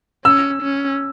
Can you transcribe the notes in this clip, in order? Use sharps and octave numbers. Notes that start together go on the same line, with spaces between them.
C#4 E6
C#4